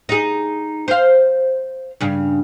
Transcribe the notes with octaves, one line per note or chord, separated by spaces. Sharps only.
D#4 G#4
C5 F5
G2 C#3